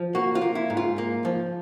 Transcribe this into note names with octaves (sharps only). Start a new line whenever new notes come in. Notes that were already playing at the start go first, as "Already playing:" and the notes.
Already playing: F3
A#3 F#4
F4
A#3
E4
G#2
F4
A#3
F3